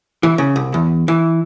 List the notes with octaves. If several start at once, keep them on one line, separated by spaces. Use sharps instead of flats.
E3
C#3
C2
E2
E3